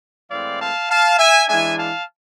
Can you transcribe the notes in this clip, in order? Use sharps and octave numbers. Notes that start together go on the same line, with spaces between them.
A2 E3 G#3 C4 D5 F5
F5 A5
F5 A5
E5 G#5
E3 G#3 D4 E5 G#5
F5 A5